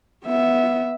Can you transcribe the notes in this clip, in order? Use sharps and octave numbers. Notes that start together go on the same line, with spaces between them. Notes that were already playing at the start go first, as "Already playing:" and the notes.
B3 E5